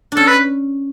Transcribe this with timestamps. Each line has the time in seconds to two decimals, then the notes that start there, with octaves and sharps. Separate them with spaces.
0.12 C#4 D4 A4
0.27 B4